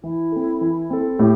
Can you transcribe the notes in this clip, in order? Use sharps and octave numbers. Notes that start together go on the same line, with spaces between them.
E3 E4
C4 A4
E3
C4 A4
A2 G4